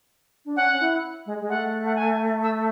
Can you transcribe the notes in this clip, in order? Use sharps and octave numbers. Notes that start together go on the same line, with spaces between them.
D4
C#4 F#5
E4
G#3
G#3
A3 F#5
F#5
G#5
E6